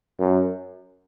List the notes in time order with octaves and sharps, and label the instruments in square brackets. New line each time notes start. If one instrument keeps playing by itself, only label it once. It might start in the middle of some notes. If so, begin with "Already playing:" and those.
[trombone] F#2